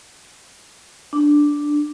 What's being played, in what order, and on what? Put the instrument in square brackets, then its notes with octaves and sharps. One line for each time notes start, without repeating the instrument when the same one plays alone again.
[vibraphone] D4